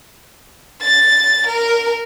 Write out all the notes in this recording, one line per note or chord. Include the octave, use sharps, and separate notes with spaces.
A6
A#4